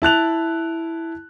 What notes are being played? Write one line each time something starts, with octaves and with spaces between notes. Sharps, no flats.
E4 A5 F#6 F7